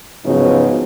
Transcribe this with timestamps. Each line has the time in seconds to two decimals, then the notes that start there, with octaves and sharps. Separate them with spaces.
0.25 G#2 C#3 F3 F#3 B3 D#4